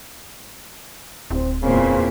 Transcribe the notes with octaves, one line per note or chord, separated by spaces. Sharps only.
D1 C4
E2 A#2 C#3 A#3 C4